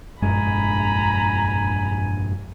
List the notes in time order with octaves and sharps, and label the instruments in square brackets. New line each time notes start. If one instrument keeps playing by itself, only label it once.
[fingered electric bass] F1 A#1 G#3 [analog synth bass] G2 [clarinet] G#5 [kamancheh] A#5 B5